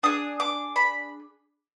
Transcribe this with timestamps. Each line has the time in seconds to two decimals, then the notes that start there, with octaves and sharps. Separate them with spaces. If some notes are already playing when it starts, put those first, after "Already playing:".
0.03 D4 G#4 D#6
0.40 D6
0.76 B5